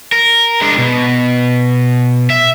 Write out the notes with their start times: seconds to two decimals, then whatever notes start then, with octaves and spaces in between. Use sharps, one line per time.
0.12 A#4
0.61 G#3 D4
0.78 B2
2.30 E5